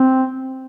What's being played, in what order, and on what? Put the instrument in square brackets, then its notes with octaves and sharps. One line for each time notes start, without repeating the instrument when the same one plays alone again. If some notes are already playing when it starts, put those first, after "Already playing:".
Already playing: [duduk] C4